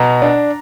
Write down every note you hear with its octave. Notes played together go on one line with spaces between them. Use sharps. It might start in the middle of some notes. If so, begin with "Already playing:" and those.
Already playing: B2 A#5
D4